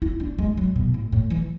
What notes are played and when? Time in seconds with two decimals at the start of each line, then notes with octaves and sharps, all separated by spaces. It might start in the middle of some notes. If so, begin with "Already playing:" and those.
0.02 E4
0.20 D4
0.39 G#3
0.57 F#3
0.76 B2
0.94 A2
1.12 A2
1.30 E3